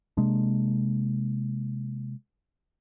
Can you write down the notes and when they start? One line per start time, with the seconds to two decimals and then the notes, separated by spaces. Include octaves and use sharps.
0.17 C3 G#3 A#3 D4